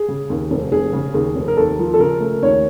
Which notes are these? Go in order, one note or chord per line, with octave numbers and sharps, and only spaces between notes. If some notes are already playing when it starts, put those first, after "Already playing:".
Already playing: G#4
C#3
D#2
F1
F1 G#4
C#3
D#2 G#4
F1
A#4
D#2 A4
F3
A4
C#3 A#4
A3
D#2 C#5